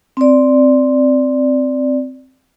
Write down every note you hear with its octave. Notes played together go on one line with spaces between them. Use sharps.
C4 D5